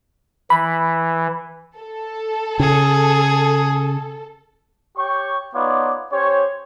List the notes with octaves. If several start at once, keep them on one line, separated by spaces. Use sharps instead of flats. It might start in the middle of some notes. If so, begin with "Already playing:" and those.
E3 B5
A4
C#3 G#4
G4 C#5 G5 C#6
B3 D#4 F4 C#5 D5 D6
C#4 G4 C5 C#5